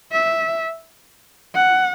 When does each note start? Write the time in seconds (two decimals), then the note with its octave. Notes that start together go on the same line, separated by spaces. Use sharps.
0.12 E5
1.55 F#5